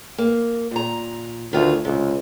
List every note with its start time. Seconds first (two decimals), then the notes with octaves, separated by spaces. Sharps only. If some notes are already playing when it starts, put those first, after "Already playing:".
0.18 A#3
0.71 A#2 A#5
1.53 D2 D#3 F4 G#4
1.85 C#2 C3